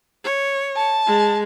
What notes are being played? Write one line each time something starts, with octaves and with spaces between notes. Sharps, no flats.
C#5
A5
G#3